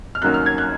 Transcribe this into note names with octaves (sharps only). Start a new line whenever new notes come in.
F6
F#2 D#3 F#3 A#3 C#4 F#6
F6
G#6
F#6